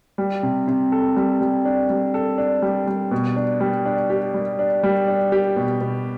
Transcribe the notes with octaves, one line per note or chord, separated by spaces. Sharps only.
G3
C3
C3
A4
G3
G3
D4
G3
A4
D4
G3
G3
B2
D4
G3
D4
G4
G3
D4
G3
D4
G4
B2
B2